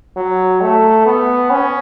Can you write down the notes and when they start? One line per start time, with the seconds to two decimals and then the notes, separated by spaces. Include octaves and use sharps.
0.17 F#3
0.61 A3
1.06 B3
1.50 C#4